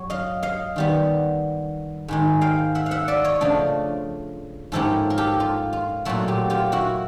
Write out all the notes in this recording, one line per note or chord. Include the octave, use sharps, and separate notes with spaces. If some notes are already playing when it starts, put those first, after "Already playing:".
Already playing: G2 F#3 C#5
D#5 F5
D#5 F5
D#3 G3 B3
G#2 D#3 G#3
F5 G5
E5 F#5
F5
E5 F#5
D5 E5
C#5 D#5
C#3 F3 A3 D4
G#2 F3 A#3 C#4 E4 G4 A4
A#4
G4 A4
F4
F4
A#2 F#3 A3 E4 F#4
F4 G4
F4 G4
E4 F#4